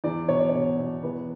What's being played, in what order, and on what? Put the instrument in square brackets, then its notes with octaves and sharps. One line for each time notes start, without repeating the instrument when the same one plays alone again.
[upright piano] E2 D5
B2 C#5
D5
B2 C#5
B2
E2 B4